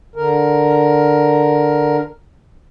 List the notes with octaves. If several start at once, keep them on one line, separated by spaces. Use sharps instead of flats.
D3 A#4